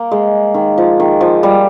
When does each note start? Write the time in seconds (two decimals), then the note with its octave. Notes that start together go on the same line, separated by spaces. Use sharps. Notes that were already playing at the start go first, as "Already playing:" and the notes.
Already playing: A#3
0.11 G#3
0.54 D#3
0.78 F3
1.00 D#3
1.21 F3
1.43 G3